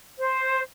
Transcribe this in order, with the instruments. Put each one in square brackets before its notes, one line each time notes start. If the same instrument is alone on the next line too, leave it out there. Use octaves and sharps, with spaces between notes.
[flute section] C5